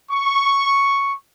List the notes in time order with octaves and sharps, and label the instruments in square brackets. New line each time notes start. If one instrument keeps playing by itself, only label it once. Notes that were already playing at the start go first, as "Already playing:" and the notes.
[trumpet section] C#6